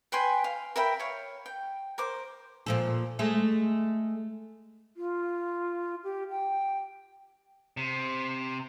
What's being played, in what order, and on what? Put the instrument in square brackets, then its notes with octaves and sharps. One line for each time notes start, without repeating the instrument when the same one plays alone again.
[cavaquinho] B4 G5 G#5 C6
F5
A#4 E5 G5 B5
C#5 F5
G5
A#4 C5 D6
[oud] A#2 F3 A4
G#3 A3 A4
[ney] F4
G4
G5
[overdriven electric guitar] C3